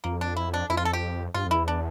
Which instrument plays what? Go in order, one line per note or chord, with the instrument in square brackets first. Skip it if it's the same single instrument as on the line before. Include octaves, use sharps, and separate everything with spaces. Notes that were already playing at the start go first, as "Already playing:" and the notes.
[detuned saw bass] F2 [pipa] A#3
[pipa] D4
E4
D4
[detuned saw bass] F2 [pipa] E4
[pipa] F4
A4
G4
[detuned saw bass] G2 [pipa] F4
[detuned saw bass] F2
[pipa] E4
[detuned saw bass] E2
[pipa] D4